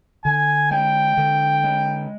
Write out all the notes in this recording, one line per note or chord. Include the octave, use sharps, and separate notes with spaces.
D3 G#5
G#3 G5
D3
G#3